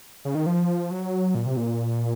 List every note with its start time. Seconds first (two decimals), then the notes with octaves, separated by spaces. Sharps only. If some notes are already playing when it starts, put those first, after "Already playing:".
0.25 C#3
0.35 D#3
0.46 F3
0.91 F#3
1.35 A#2
1.46 C3
1.57 A#2